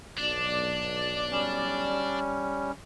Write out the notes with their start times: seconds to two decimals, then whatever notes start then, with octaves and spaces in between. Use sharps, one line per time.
0.18 B1 D4 D5
1.31 G3 C#4